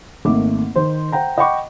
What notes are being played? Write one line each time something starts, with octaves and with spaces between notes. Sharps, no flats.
G#1 A3 A#3 D6
D#3 C5
C5 F#5 G5 A#5
D#5 F#5 G5 B5 C#6 D6